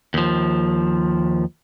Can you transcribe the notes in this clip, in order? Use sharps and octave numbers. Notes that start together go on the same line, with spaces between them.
D#2 F3